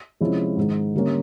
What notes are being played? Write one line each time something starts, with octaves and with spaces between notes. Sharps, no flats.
C3 F3 G#3 C#4 E4
G#2 D#3 G#3
D3 G3 A#3 C#4